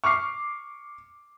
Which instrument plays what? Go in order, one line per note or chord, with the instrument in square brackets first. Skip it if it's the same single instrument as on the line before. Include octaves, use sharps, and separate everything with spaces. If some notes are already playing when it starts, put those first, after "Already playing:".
[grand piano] C#6 D6 F6 C7